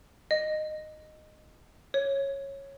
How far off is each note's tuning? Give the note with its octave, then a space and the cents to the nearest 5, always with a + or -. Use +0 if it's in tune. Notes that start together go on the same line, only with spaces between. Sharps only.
D#5 -15
C#5 -10